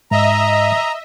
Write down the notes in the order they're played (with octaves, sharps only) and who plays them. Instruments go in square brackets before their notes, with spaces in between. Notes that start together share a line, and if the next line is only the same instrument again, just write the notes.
[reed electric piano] G#2 [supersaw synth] D#5 E5 [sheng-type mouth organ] A#5